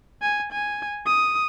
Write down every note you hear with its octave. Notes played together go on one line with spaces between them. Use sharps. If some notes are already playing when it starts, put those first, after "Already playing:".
G#5
G#5
D#6